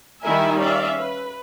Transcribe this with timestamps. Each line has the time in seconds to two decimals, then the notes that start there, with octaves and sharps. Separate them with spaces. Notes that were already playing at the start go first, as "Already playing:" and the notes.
0.23 D#3 G3 E4 A#4 E5 G#5
0.60 C#4 D5 E5 F5
1.00 B4